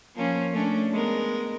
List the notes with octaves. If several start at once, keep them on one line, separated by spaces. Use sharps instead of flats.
F3 A#3 C#4
A3 C#4 D4
G#3 B3 A#4